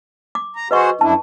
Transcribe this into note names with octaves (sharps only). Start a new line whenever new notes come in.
D6
A#5
F#4 G#4 B4 C5 D#5 C#6
F#2 D4 E4 A5